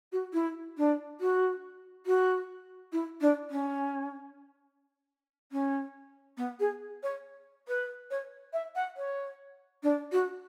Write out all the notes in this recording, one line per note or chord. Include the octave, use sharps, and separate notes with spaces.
F#4
E4
D4
F#4
F#4
E4
D4
C#4
C#4
B3
G#4
C#5
B4
C#5
E5
F#5
C#5
D4
F#4